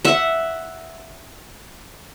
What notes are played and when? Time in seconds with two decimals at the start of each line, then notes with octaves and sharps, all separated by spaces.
0.05 E5 F#5